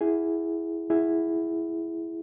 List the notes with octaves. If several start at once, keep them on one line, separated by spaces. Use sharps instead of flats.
E4 G#4
E4 G#4